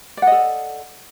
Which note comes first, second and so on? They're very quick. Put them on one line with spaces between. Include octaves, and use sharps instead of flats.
D5 F#5 D#5 A4